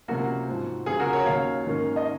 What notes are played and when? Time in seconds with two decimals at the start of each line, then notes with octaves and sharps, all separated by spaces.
0.08 C#2 C3 F#3 A#3 C#4 F#4
0.48 G#2 F3 C4
0.86 C#2 C#3 F#3 C4 G#4
1.00 F#4 A#4
1.13 A#4 C#5
1.25 D#2 D#3 F#3 A#3 C#4 C#5 F5
1.66 G#2 D#3 A#3 C#4
1.96 D#5